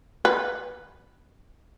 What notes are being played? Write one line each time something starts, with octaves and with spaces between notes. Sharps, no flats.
B4